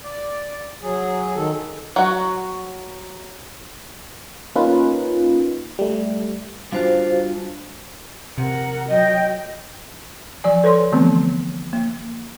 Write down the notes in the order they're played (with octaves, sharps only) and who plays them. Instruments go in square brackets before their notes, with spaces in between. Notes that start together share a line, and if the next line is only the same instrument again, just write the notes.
[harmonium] D5
F#3 G#4
D#3 A4
[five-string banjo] F#3 F#4
[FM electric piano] A#3 C#4 D#4 F4 B4
G3 A3
[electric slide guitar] G3 D4 F4 [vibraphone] F#4 C5 F5
[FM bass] C3 [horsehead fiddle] A#4 F#5
[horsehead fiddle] F#3 G5 [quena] D#5
[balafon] F3 D5 G#5
A4 B4 C#5 C6
D3 E3 F3 A3 B3 C4
A#3